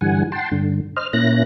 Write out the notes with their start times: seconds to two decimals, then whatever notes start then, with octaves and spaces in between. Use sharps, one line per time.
0.01 G2 D3 E3 G3 F#5 G#5
0.32 F#5 G5 A5 C6
0.51 G2 D3
0.97 C5 D#5 F6
1.13 A#2 A#3 C#4 E4 F#6 A#6